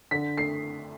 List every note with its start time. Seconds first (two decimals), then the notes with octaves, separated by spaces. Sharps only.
0.11 D3 B6
0.38 A3 C7